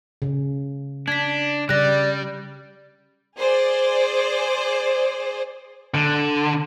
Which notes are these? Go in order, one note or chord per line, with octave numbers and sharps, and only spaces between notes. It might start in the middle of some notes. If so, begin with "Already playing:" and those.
C#3
D4 G#6 B6
C#3 G3 D5 F#6 A#6
G#4 C5 D5
D3